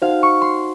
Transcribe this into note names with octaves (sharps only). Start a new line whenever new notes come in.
D#4 F#4 C5 F5 F#5
C#6
C6